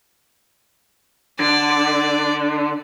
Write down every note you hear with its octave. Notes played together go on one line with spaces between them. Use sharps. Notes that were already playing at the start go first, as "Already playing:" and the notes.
D3 D5